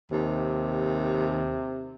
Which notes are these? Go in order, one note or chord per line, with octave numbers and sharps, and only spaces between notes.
D#2 C3